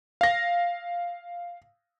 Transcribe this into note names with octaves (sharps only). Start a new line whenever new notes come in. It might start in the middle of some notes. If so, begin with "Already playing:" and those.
F5 A#6